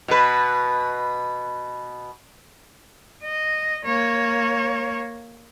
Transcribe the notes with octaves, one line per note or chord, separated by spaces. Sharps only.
B2 B4
D#5
A#3 C#5